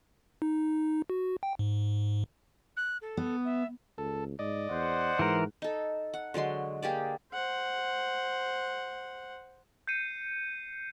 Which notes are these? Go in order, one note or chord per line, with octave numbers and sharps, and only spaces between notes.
D#4
F#4
G5
G#2
F#6
A4
B3
E5
C#2 A4
G#2 D5 D#5
E2 C5 F#5
G#2 E3 A#4
D#4 A4
F#5
D3 F#3 G#3 C6
A#3 G4 G#4 D5
C5 F#5
G6 C7 C#7 D#7